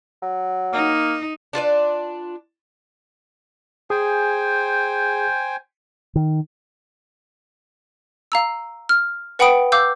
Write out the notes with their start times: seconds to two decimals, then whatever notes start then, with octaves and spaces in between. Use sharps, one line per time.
0.22 F#3
0.73 A#3 D#4
1.53 D4 F4 B4 D5
3.90 G#4 C5 G5 G#5
6.16 D#3
8.32 F5 A#5 E6
8.89 F6
9.39 B4 F#5 G5 B5 D#6 D7
9.72 F5 D6 E6 G6